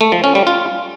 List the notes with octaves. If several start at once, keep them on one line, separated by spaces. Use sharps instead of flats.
A3
F3
C#4
G3
F4